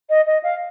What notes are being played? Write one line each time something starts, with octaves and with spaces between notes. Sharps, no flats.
D#5
D#5
F5